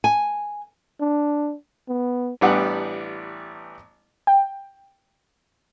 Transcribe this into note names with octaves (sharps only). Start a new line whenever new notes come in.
G#5
D4
B3
A1 E3 G3 B3 D4 F#5
G5